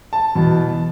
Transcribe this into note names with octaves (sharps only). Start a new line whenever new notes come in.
A5
E2 B2